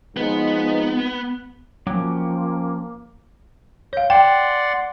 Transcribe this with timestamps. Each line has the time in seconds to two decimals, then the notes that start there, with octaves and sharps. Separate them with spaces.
0.17 F3 G#3 B3 D#4
1.87 F3 F#3 A#3 C#4 G5 D6
3.93 C#5 F5 G6
4.10 D5 F#5 G5 C6